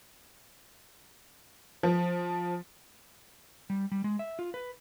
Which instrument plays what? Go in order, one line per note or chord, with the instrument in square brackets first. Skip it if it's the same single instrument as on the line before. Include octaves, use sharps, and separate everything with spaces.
[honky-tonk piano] F3
[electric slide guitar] G3
G3
G#3
E5
F4
B4